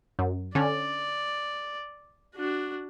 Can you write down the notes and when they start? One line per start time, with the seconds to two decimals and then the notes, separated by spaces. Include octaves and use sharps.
0.19 F#2
0.55 D3 C#4 D5
2.35 D4 F#4